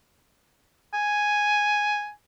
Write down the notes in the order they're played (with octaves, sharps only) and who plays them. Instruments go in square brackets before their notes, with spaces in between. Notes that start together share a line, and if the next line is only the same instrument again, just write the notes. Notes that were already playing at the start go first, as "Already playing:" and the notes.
[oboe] G#5